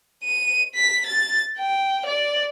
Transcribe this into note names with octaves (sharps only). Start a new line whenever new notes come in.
D#7
B6
A6
G5
D5